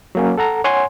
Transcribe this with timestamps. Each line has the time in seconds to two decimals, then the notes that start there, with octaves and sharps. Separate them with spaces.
0.15 F#3 A#3 C#4
0.38 A4 F#5 A#5
0.64 C#5 F#5 G#5 C6